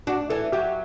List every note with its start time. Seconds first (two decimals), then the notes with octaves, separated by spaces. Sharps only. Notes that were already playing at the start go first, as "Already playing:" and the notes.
0.07 D4 F#4
0.30 E3 A4
0.52 F#3 G4